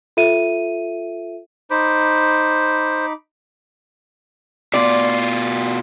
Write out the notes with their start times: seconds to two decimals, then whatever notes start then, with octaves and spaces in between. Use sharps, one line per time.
0.17 F4 A4 E5 D#7
1.71 D#4 C5 B5 D6
4.74 B2 F4 D5